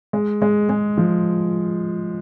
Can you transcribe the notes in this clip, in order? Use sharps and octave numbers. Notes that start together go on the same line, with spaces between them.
G#3
G#3
G#3
F3